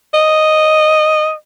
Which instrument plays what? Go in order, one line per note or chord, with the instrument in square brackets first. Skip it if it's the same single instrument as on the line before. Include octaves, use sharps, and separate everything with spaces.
[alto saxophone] D#5